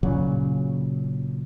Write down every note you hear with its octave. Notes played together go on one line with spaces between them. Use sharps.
A#2 C#3 F#3